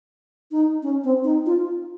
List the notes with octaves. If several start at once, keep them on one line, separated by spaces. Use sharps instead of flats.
D#4
C#4
C4
D#4
F4